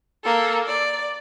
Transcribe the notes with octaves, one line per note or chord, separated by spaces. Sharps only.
A#3 A4
D5